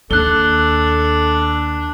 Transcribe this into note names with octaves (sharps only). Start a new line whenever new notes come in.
D#2 D4 A4 F#6 G7